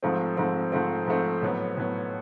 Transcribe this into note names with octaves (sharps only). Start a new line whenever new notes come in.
G#2 F3 A3 C4
G#2 F3 A3 C4
G#2 F3 A3 C4
G#2 F3 A3 C4
A2 F#3 B3
A2 F#3 B3